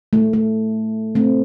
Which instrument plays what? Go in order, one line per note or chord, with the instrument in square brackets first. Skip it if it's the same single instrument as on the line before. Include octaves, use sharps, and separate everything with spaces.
[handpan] A3
A3
A3 C4